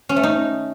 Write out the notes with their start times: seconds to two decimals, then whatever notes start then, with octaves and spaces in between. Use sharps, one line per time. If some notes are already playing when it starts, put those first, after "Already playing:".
0.09 C#4
0.16 A3
0.23 D#4